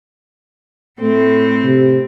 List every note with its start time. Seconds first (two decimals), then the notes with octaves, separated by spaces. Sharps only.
1.01 A2 A3 C4
1.65 C3